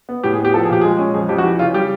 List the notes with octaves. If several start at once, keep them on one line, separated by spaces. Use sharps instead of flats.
B3
A2 G4
G#4
B3 G4
F3 A4
G#4
A#2 G4
G#3 G#4
C#4
F2 G#4
F2 G4
F#4
E3 G4
C#3 F4
G3 G4